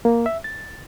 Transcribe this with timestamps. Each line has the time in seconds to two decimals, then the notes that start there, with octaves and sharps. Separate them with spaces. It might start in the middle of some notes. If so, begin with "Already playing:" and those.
0.05 A#3
0.26 E5
0.44 A6